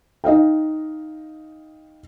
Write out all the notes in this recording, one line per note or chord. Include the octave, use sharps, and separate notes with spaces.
D#4 D#5 F5 G5